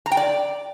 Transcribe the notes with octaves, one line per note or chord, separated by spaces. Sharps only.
A#5
G5
D5